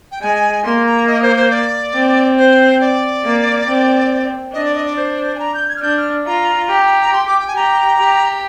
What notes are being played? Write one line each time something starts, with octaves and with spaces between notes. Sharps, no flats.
G5
G#3 G#5
A#3 C6
A#5
D#5
C5
C5
D5
C4
C5
D5
A#3
C4
D4 D#5
D5
D#5
D5
C5
G#5
A#5
G6
G#6
F6
D4 G6
F6
F4 A#5
G4
A#5
C6
D6
G5
G#5
G4 A#5
G4